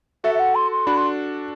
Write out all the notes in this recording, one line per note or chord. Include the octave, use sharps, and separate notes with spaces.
F#4 A4 E5
E5
F#5
C6
C6
D4 F#4 B5
C6